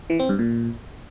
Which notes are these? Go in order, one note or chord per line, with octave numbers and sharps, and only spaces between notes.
E3
C4
G2
A#2